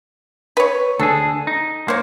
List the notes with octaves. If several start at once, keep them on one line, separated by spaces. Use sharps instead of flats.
B4 C#5
D2 D4 G#4 A4
D#4
A#3 C5 C#5